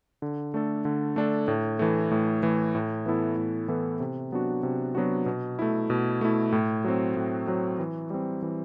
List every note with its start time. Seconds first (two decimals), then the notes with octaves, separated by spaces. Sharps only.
0.22 D3
0.54 A3 D4 A4
0.85 D3
1.16 A3 D4 A4
1.48 A2
1.79 E3 A3
2.11 A2
2.43 E3 A3
2.75 A2
3.06 E3 B3 E4 A4
3.37 A2
3.68 E3 B3 E4 A4
4.00 C3
4.32 F#3 B3 D4 F#4
4.63 C3
4.95 F#3 B3 D4 F#4
5.26 B2
5.59 A3 E4
5.90 B2
6.21 A3 E4
6.52 A2
6.84 F#3 C4
7.16 A2
7.47 F#3 C4
7.79 E3
8.10 G3 C4
8.42 E3